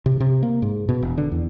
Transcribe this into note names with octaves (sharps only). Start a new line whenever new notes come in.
C3
C3
A#3
G#2
B2
E1
D3
E2